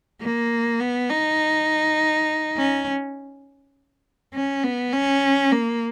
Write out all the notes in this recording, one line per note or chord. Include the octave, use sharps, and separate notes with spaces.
A#3
B3
D#4
C#4
C#4
B3
C#4
A#3